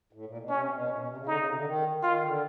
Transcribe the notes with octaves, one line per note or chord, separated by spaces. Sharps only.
A2
A#2
B2
C3 C#4
B2
A#2 C#4
B2
C3
C#3
D3 D#4
C#3
C3
D3
D#3
D#3 F4
D3